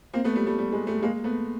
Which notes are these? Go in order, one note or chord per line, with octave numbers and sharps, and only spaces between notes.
A#3 C4
A3 B3
G3 A3
G3 A3
G3
G#3
G3 A3
G#3 A#3
A3 B3